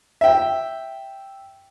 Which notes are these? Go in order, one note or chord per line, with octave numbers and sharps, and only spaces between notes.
E5 G5